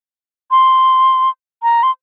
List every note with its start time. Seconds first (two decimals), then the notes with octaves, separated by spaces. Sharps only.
0.51 C6
1.63 A#5
1.83 C6